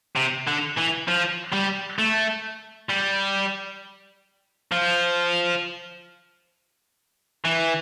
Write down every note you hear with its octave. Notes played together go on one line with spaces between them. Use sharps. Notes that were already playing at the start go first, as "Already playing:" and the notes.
C3
D3
E3
F3
G3
A3
G3
F3
E3